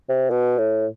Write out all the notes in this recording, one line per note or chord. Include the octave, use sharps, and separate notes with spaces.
C3
B2
A2